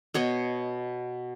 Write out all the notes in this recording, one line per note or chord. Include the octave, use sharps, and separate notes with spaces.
B2 C#5 D#5